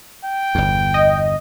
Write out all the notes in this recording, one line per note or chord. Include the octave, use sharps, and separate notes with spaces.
G5
G1 E2
D#5